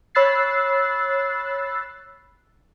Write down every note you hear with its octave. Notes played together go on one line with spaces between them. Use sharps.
C#5 B5 E6 F#6 A6 C7